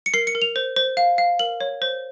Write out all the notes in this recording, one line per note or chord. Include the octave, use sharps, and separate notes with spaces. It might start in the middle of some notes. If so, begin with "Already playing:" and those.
C#7
A#4 C7
C#7
A#4
F7
C5
C5
F5
F5
A#4 F#7
C#5
C5